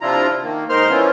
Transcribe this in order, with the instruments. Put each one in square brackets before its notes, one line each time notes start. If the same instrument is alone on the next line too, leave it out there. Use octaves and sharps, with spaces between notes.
[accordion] C3 F3 D4 E4 F4 A#5
D#3 A#3
G#2 D#4 A#4 C5 C6 F6
F3 B3 C#4 E4 F4